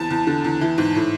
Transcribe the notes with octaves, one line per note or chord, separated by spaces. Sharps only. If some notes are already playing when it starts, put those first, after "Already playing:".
Already playing: E2 A5
E2
D3
E2
E3
G#2
A2